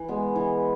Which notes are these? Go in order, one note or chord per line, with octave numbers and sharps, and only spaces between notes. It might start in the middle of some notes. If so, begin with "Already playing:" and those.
Already playing: E3
G#3 B3
E3